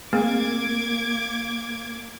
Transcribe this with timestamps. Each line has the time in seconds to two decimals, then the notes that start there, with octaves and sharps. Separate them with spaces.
0.13 A3 A#3 C4 G#4 D6 G#6